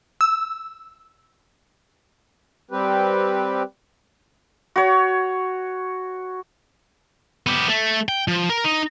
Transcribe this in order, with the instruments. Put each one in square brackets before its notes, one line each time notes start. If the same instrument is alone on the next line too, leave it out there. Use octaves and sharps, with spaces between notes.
[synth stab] E6
[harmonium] G3 C4 G4 B4
[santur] F#4 C#5
[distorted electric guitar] B3 G4
A3
G5
F3
A#4
D#4